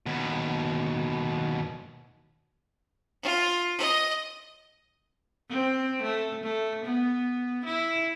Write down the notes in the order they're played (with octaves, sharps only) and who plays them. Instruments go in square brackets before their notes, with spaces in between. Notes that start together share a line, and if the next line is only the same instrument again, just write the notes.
[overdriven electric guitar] D#2 B2
[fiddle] F4
D#5
[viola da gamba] C4
A3
A3
B3
E4